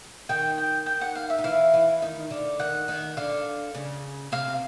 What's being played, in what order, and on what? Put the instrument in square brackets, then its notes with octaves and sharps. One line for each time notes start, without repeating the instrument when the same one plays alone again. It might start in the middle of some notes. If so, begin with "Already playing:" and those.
[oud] D#3 D#4 [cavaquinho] G5
[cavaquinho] G5
G5
F#5
F5
E5
[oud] D#4
[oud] E3 E4 [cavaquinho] F5
[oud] E3 E4
D#3 D#4
D3 D4
[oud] D#3 D#4 [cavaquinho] F#5
[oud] D#3 D#4
[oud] D3 D4 [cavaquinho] F5
[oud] C#3 C#4
[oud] C3 C4 [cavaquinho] F5